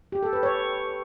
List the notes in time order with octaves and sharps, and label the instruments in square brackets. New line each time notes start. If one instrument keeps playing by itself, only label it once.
[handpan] G4
A4
B4
C#5